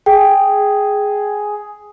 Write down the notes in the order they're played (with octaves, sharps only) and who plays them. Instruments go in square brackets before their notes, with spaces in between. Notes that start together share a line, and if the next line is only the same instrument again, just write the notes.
[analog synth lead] G#4 [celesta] G5